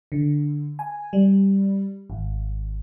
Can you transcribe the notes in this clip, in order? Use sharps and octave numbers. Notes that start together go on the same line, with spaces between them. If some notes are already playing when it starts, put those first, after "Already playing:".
D3
G#5
G3
G#1